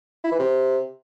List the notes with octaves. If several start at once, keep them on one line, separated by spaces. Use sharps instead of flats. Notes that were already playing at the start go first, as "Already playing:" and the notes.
E4
E3
C3